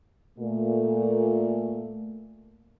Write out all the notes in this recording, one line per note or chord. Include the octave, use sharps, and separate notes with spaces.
A#2 A3